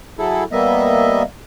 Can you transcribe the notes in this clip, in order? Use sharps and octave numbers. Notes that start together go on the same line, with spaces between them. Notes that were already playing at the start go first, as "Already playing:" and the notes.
F#3 E4 G#4 A4
G3 A#3 B3 D#5 E5